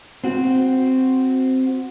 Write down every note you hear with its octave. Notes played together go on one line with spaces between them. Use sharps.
C4 F#4